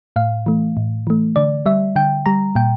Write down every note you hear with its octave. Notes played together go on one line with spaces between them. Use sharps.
A2 F5
E3 A3
A2
E3 A3
D3 D5
G3 E5
D3 G5
G3 A#5
A#2 G5